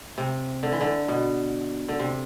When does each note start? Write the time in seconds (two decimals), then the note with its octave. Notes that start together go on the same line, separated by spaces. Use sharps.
0.18 C3
0.63 D3
0.72 E3
0.81 D3
1.08 B2
1.89 D3
1.99 C3